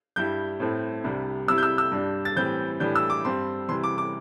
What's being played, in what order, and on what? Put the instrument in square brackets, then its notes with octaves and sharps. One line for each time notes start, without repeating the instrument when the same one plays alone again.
[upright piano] G2 G3 E4 G6
A2 A3 C4 E4
C2 C3 G3 D4
C3 G3 E4 E6
G6
E6
E6
G2 G3 D4
A6
A2 E3 G3 C4 G6
A2 E3 G3 D4 G6
E6
D6
G2 G3 C4 C6
C3 E3 G3 C6
D6
D6